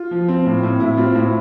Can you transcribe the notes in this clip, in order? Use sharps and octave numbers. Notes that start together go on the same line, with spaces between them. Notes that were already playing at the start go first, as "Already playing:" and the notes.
Already playing: F4
F3
C4
A2
A2
A2 E4
C4 F4
A2 E4